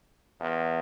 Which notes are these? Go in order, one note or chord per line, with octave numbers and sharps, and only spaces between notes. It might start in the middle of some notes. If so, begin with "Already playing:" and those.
E2